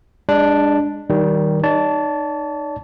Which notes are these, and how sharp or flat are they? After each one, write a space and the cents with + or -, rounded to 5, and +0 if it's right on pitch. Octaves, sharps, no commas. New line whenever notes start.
G#3 -30 D4 +0
D#3 +10 G3 -20
D#4 -25 D5 -45 A5 +0